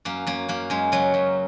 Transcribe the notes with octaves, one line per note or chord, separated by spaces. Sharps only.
F#2 A#3
F#2 A#3
F#2 A#3
F#2 G#3
C#3 F#3
F#2